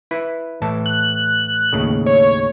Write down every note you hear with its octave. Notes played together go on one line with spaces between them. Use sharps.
E4 B4
A2 E3 A5
F#6
D#2 A2 C#3
C#5